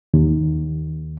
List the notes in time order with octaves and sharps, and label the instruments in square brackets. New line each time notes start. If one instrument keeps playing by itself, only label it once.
[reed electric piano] D#2